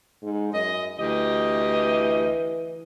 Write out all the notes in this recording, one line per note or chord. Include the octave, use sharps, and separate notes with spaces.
G#2
F#2 D#5
D2 E3 G4 D#5